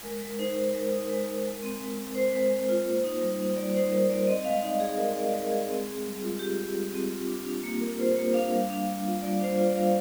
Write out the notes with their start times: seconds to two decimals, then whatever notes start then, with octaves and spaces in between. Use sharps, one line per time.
0.03 G#3 A#4
0.21 G#3
0.38 D#4 C5
0.56 D#4
0.73 G#3 A#4
0.92 D#4
1.09 G#3
1.26 G#3
1.45 G#3
1.63 C4
1.80 G#3
1.98 C4
2.15 C4 C5
2.33 G#3
2.51 G#3
2.69 F4
2.86 A#3
3.04 D#4
3.21 G3
3.39 D#4
3.56 G3 D5
3.74 D#4 C5
3.92 G3 A#4
4.09 G3 D5
4.27 C4 D#5
4.45 G#3 F5
4.63 D#4 D5
4.80 G#3 G#4
4.98 G#3 A#4
5.16 G#3 D5
5.33 G#3 A#4
5.51 G#3 G#4
5.69 C4
5.87 C4
6.05 G3
6.22 F4
6.39 F4 G4
6.57 F4
6.75 G3
6.92 C4
7.11 F4
7.28 D4
7.46 D4
7.64 A#3
7.81 D4 A#4
7.99 F4 C5
8.16 A#3
8.34 D4 F5
8.51 G3
8.70 D4
8.87 G3
9.05 F4
9.22 G3 D5
9.40 D4 C5
9.58 F4 D5
9.76 G3 F5